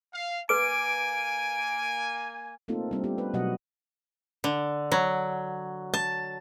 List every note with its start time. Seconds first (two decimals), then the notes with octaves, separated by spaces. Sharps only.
0.13 F5
0.49 A#3 B4 G#5 D6 D7
2.68 A3 A#3 C4 D#4 F4 A4
2.91 G3 C4 D4
3.04 B3 C4 G4
3.18 B4
3.34 B2 F#3 F#4 D#5 F#5
4.44 D3
4.92 F#3
5.94 A5